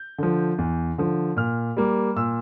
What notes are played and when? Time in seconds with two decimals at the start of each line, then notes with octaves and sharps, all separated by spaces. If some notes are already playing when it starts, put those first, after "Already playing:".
Already playing: G6
0.18 D3 F3
0.58 E2
0.98 D3 F3
1.37 A#2 F6
1.77 G3 A#3
2.16 A#2 E6